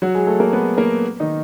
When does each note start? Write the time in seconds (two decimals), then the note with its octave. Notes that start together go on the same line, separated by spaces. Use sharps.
0.02 F#3 F#4
0.15 G#3 G#4
0.27 A3 A4
0.40 A#3 A#4
0.53 B3 B4
0.77 A#3 A#4
1.20 D#3 D#4